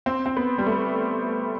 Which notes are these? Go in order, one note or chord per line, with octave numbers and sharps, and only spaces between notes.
C4
C4
B3
G3
A3